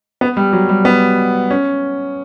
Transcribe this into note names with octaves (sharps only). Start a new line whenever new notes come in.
B3
G3
F#3
G3
B3
C#4